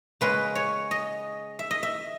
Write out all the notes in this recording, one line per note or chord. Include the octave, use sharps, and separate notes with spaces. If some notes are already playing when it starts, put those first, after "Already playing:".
C#3 G#3 C#4 B4
C#5
D#5
E5
D#5
E5